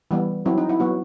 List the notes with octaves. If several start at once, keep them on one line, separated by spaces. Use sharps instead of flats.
E3 G3 B3
F#3 C4 E4
D#4
E4
F#3 B3 F#4